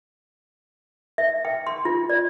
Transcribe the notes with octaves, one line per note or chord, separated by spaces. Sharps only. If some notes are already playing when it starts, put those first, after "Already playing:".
E5
G5
C6
F4
D5